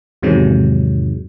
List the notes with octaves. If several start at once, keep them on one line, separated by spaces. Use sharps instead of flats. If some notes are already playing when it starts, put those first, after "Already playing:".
E2 G#2 C3 D#3 F#3 G#3